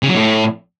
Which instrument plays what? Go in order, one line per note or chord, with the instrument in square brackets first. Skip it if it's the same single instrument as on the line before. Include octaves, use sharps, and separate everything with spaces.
[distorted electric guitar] C#3
F#3
A2